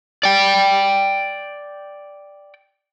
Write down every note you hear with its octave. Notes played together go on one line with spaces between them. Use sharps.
D5 G5